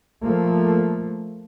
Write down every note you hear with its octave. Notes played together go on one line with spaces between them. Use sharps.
F3 A3 A#3